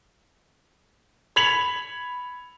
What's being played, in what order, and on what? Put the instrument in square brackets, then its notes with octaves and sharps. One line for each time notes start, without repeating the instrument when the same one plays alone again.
[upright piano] B5 G#6 B6 C#7 F7 F#7